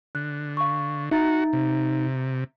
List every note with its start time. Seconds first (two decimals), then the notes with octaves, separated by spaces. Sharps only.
0.15 D3 F#6
0.57 F5 C#6
1.11 D#4 F#4 E5 A#5 A6
1.53 C3